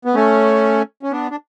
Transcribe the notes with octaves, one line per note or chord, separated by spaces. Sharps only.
B3
A3 C#4
C#4
B3 D4
D4